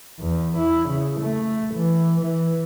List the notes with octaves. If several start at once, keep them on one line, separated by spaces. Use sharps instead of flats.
E2
E4
C#3
A3
E3
E3